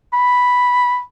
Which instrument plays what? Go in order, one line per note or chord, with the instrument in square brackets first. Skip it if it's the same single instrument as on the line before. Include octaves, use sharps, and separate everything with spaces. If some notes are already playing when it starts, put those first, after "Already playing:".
[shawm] B5